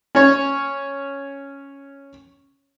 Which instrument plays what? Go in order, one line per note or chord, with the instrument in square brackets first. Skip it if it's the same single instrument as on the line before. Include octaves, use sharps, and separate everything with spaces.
[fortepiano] C#4 C#5